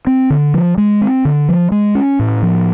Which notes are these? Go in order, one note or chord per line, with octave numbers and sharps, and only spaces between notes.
C4
D3
F3
G#3
C4
D3
F3
G#3
C#4
A2
F3